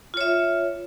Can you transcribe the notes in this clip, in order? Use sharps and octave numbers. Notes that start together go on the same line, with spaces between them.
F4 C#5 E5